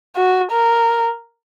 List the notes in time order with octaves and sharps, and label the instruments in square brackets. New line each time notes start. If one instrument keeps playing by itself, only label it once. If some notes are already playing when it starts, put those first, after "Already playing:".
[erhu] F#4
A#4